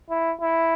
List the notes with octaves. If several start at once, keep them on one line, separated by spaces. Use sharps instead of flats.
E4
E4